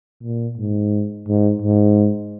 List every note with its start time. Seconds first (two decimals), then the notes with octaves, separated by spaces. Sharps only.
0.23 A#2
0.58 G#2
1.28 G#2
1.62 G#2